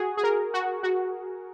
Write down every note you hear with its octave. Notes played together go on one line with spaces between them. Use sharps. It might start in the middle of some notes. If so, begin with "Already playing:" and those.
Already playing: F#4 G#4
G#4
A#4
F#4
F#4